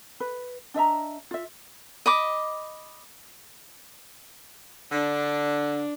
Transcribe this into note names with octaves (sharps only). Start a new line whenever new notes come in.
B4
D4 D#5 E5 A#5
F4 E5
D#5 B5 D6
D3 D4